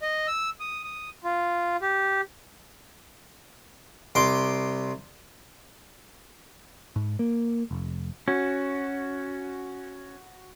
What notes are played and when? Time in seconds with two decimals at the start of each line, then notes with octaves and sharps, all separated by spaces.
0.02 D#5
0.27 E6
0.60 D#6
0.84 D#6
1.24 F4
1.82 G4
4.15 C2 C6 D6
6.96 G#2
7.19 A#3
7.71 F1
8.28 C#4 F#4